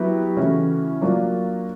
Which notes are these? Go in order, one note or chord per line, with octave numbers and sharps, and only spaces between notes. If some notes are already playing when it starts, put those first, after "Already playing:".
Already playing: F#3 B3 E4 G4
C#3 E3 A3 C#4 F#4
F#3 A#3 D4 F4